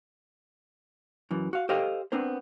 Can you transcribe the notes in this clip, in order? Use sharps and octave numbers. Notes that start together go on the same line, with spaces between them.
F#2 E3
F#4 F5
G4 A4 C5 D#5 F5 G5
B3 C4 D4 A#4 C5